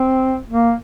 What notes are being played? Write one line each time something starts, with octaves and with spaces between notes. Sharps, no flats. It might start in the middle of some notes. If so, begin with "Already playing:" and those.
Already playing: C4
A#3